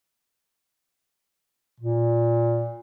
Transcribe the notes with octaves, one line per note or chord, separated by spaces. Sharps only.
A#2